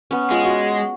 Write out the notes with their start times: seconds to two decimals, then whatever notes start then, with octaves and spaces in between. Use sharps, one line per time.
0.11 B3 C#4
0.31 G#3 F4 G#4 C#5
0.45 F#4